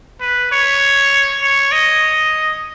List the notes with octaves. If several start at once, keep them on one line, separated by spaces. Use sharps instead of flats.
B4
C#5
C#5
D#5